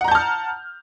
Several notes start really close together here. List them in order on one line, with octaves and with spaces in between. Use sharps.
F#5 A#5 G6 A5 F6